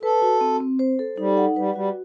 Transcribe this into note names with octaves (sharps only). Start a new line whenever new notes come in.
A4 B4
F#4
C4
C4
C5
A4
G3 D#4
F#5
G3 B4
G3 F#4